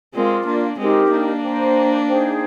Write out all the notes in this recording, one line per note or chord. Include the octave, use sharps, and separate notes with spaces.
G#3 C4 F4 A#4 D5
A#3 D4
G#3 C4 D#4 G4 A#4 D#5
A#3 D4
C5 G5 A#5
D#4 G#4 C5 G5